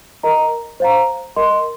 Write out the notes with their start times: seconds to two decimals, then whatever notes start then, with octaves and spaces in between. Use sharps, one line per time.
0.23 A#4 D#5 A#5
0.80 C5 F5 A#5
1.36 A#4 D#5 C6